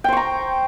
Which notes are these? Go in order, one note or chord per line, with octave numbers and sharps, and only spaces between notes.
C5 G5 A#5 C#6